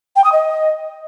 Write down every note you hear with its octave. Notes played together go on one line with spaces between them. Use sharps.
G5
D#6
D#5